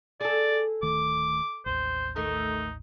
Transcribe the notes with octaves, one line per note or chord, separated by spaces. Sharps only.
G#4 A4 D5
D1 D#3 A3 D6
A1 D#2 C5
D#3 A3 D#4